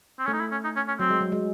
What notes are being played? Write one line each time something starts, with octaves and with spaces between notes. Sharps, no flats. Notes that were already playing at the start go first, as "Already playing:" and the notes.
C4
A3 C#4
D#4
E4
C#4
D#4
C#4
C#4
F#3 C4
G#3
F#3
G#3